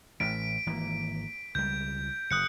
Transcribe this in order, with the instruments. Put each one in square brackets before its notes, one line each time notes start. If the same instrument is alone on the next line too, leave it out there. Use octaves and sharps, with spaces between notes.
[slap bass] A1 A2 [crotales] B6 D7
[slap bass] G#1 E3 A#3
[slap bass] C#2 G3 [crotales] G6
[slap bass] F#1 [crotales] D#6 F#6 C#7